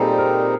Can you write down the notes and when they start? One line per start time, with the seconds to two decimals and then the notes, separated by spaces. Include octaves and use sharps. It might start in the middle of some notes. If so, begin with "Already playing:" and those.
Already playing: A#2 G3 C4 D#4 G#4 A4
0.18 A#4